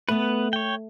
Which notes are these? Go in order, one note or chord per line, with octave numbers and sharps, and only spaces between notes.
A3 B3 B4
C#5 G5